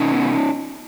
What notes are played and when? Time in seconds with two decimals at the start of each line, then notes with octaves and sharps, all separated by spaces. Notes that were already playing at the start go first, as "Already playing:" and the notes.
Already playing: C3 C#4 D#4
0.12 B3